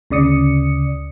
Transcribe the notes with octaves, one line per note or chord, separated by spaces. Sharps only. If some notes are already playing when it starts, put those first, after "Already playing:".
D2 C#3 D5 D#6 C#7